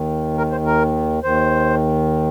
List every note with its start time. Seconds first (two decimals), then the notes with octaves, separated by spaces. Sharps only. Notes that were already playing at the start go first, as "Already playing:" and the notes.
Already playing: D#2 D#3
0.38 A#4
0.51 C5
0.66 A#4
1.24 D#2 D#3 C5